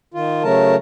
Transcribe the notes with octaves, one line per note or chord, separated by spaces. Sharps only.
D#3 F4
C#3 F#3 A3 A#4 A5